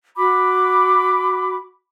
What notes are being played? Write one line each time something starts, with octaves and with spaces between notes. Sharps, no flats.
F#4 B5 D6